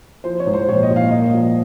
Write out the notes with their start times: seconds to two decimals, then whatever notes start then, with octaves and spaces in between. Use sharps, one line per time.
0.24 F3 C5
0.40 C#5
0.47 G#2
0.53 C5
0.68 A#1 C#5
0.83 D#5
0.90 A#1
0.96 F5
1.11 A#3 D#5
1.34 F3